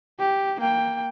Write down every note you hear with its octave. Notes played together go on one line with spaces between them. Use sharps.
G4
A#3 G5